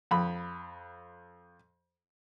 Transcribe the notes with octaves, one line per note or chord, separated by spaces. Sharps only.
F2 B5